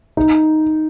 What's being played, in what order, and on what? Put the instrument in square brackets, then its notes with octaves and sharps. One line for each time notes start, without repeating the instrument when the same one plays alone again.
[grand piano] D#4